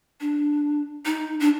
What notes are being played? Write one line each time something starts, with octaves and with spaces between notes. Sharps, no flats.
D4
D#4
D4